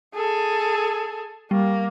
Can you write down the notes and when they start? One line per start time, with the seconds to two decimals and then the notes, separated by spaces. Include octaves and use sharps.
0.14 G#4 A4
1.51 G3 A#3